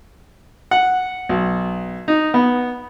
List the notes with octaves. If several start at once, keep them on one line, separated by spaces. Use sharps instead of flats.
F#5
B1
D#4
B3